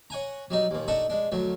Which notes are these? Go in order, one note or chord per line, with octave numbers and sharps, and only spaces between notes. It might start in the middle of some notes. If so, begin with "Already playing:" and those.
C#5 F#5 G#5 A#5
F#3 G3 D#4
D#2 A#2
D4 D#4 A4 F#5 A#5 C#6
G#3 D4
D2 F#3 A3